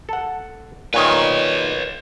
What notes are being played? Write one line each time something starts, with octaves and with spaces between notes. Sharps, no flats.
A4 F#5
A#2 D#3 B4 C#5